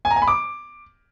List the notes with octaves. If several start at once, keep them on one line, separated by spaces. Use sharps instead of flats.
G#5
A#5
G#5
B5
D6